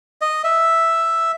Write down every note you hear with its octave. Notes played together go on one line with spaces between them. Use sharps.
D#5
E5